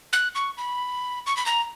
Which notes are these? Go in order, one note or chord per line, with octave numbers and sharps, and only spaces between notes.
F#6
C#6
B5
C#6
B5
A#5